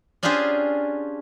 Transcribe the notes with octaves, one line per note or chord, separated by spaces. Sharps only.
C#4 D4 F4 G4 G#4 C5